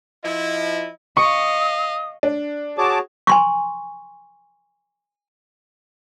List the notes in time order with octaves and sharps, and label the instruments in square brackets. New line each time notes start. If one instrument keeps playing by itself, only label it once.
[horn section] F3 E4 [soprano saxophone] D#5
[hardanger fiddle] D#5 F5 [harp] C#6 [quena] D#6
[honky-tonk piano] D4
[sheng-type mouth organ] F#4 G#4 C#5 [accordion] A5 D6
[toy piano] G#5 C6 C#6